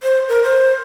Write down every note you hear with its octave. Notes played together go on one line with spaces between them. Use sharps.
C5
A#4
C5